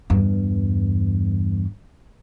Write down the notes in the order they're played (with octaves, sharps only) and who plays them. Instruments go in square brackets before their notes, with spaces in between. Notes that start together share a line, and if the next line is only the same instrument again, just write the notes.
[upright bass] E2 G2